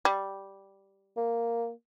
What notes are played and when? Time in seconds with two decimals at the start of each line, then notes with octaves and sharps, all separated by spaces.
0.05 G3
1.17 A#3